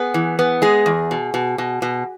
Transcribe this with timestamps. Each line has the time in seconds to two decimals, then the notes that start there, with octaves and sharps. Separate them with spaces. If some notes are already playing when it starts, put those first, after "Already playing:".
Already playing: B3 G#4
0.14 E3
0.39 B3
0.62 G#3 G#4
0.86 E2
1.11 B2
1.34 B2
1.58 B2
1.82 B2